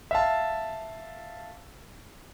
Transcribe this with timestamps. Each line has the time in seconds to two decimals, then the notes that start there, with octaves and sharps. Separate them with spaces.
0.11 E5 F5 A5